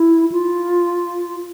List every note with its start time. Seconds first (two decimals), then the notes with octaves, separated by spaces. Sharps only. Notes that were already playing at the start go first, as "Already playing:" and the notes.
Already playing: E4
0.32 F4